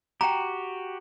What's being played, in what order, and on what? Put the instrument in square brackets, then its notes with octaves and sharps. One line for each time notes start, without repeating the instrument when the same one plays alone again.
[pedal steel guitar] F#4 G4 [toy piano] G5 A#5